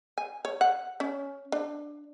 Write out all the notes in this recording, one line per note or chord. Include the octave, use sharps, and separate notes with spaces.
G#5
C#5
F#5
C#4
D4